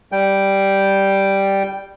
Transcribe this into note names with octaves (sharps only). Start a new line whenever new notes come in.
G3 G5